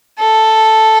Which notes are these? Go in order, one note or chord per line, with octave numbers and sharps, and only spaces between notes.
A4